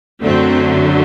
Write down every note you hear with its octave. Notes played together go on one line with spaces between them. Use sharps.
F#2 D3 F#3 A3 C4